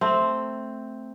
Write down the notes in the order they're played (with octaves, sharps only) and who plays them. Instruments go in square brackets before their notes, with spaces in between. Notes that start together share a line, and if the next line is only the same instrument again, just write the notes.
[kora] A3 C4